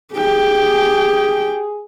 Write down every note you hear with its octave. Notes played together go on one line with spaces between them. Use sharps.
G4 G#4 G5